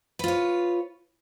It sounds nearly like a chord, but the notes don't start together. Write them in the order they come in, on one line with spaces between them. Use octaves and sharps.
B4 F4 C#5